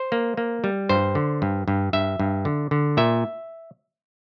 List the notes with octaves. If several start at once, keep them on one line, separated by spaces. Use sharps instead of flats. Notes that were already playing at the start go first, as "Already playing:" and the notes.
Already playing: C5
A#3
A#3
G3
G2 C5
D3
G2
G2
G2 E5
G2
D3
D3
A#2 E5